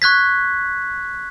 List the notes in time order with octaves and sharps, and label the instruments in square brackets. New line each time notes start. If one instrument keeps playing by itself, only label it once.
[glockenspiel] C#6 F#6 G#6 B6